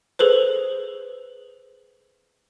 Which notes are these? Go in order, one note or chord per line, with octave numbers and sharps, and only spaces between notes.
G#4 A4 B4 C5